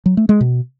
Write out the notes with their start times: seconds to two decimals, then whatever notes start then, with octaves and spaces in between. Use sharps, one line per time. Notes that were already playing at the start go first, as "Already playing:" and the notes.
0.06 F#3
0.17 A3
0.29 G#3
0.41 B2